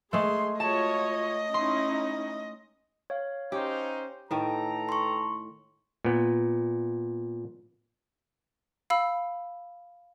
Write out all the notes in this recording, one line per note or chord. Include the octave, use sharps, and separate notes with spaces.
G#3 A3 G#4 C6
F4 F#4 C#5 D#5 A5
C#4 D#4 E4 C6
C#5 F5
C#4 D#4 G4 C5
A2 D#3 A4 B4 G5 A#5
C6 C#6
A#2 B3
F5 B5 E6